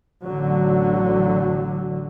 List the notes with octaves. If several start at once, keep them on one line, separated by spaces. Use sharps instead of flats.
A1 D3 F#3